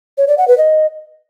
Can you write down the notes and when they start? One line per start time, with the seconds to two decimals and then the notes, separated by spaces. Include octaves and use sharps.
0.18 C#5
0.28 D5
0.38 F#5
0.48 B4
0.58 D#5